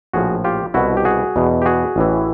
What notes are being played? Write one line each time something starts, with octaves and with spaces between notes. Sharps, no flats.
A#1 A2 F3 F#4 G#4
F4 G4
C2 B2 E4 F#4
G4
F#4 G#4
E2 B2
G4
F#4 G#4
A1 A2 E3